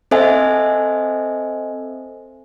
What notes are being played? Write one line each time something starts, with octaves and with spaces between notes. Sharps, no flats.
C4 A4 C5 D#5 E5 G#5